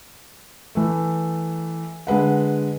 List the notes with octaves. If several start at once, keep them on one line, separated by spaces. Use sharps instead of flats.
E3 A3
D3 G#3 B4 F#5